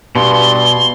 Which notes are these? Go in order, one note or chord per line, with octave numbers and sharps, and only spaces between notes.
G2 B2 C6